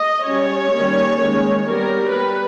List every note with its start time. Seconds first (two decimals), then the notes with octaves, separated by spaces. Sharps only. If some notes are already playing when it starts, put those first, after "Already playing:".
Already playing: D#5
0.25 G3 C#4 C#5
0.71 D#3 G3 A#3 C#4
1.19 D#3 G#3 C#4
1.65 G3 B3 A#4
2.11 G3 B3 B4